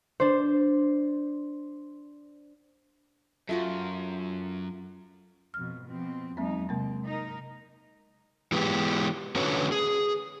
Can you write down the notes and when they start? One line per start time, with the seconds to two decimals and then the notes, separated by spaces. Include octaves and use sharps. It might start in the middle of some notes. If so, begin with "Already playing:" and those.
0.20 D4 C5
3.49 F#2 A3 F4 F#4
5.54 F2 B2 F6
5.85 B2 F3 C4
6.37 E2 F#3 G#3 A#3 C4 D#4
6.69 C3 G#3 A#3 C4
7.07 D#4 A#4
8.52 E3 G#3 B3 D#4 G4
9.36 D3 C#4 F#4 A4 B4 C#5
9.72 G#4